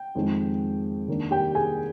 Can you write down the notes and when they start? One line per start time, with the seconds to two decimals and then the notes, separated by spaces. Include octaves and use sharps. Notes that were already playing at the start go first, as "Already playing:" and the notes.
Already playing: G5
0.15 F2 D#3 G#3
1.08 D#2 D#3 A#3 D4
1.31 G4 G5
1.55 G#4 G#5